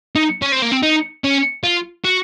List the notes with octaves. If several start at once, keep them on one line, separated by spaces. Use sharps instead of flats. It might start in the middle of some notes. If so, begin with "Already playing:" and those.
D#4
C#4
C4
A#3
C4
D#4
C#4
F4
F#4